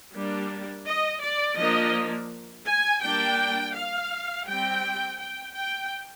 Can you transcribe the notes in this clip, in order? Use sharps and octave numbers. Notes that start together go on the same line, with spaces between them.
G3 A#3 D4
D#5
D5
F3 A#3 D4 D#5
G#5
G3 A#3 D4 G5
F5
G3 C4 G5
G5
G5